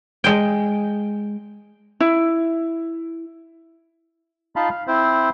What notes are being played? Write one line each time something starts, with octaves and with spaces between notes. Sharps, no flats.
G#3 G5
E4
D#4 F4 F5 A5 B5 C6
F5
C4 E4 C5